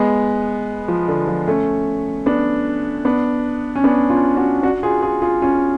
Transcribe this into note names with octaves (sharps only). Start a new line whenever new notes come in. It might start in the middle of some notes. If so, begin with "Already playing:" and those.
Already playing: G#3 B3
F3
D3
F3
A3 C#4
B3 D4
B3 D4
C#4
B3 D4
C#4 F4
D4 F#4
D4 F#4
F4 G#4
F4 G#4
F4 G#4
C#4 F4